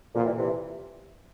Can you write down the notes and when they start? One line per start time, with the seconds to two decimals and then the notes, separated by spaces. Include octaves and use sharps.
0.15 A#2 D3 F3
0.25 E3 G3
0.36 C3 E3